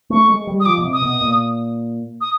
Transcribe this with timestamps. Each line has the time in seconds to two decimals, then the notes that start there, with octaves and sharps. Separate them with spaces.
0.10 A3 C#6
0.29 G#3
0.47 G3
0.60 D#6
0.66 F3 D6
0.78 B2
0.84 C3
0.93 D#6
1.02 B2
1.21 A#2
2.21 D#6